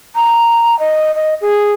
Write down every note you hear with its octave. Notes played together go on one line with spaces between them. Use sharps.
A#5
D#5
D#5
G#4